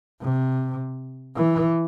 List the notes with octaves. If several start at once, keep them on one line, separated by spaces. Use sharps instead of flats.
C3
E3